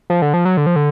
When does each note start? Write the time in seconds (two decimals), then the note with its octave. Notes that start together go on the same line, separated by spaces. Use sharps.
0.10 F3
0.22 D3
0.34 F3
0.45 F#3
0.57 D3
0.66 F3
0.76 D3